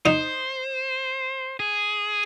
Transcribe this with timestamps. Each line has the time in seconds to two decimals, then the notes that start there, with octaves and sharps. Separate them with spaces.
0.06 D#4 C5
1.60 G#4